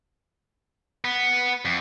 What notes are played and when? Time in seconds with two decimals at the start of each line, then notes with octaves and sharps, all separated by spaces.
1.05 B3
1.65 F2